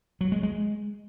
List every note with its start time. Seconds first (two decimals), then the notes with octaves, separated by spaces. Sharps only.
0.21 F#3
0.32 G#3
0.43 G#3